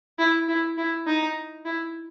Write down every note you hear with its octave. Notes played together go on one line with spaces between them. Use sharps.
E4
E4
E4
D#4
E4